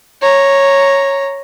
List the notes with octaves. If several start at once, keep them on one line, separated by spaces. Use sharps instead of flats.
C#5 A#5